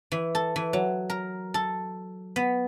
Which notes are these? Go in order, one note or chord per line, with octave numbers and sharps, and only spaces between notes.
E3
A4
E3
F#3
A#4
A4
B3